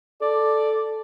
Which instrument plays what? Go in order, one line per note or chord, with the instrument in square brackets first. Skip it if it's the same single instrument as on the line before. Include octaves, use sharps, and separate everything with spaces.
[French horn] A4 [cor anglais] D5